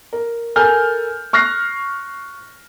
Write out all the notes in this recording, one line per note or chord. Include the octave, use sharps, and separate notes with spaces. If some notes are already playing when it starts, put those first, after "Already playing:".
A#4
A4 A#4 G#5 F6 G6
C#6 F6 F#6 A#6 C7